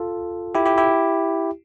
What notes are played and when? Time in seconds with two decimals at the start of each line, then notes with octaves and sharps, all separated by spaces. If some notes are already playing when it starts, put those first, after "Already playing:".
Already playing: F4 A4
0.55 E4 G4
0.66 E4 G4
0.78 E4 G4